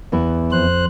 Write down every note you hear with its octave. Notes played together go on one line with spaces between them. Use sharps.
E2 B3 E4
F2 C5 F#6